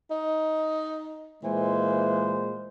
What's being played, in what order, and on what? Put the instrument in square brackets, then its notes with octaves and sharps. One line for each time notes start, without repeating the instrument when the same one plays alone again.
[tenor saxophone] D#4
[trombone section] A#2 G#3 C5 [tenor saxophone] E3